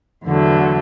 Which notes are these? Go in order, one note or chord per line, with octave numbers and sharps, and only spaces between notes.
E2 D3 F#3 A3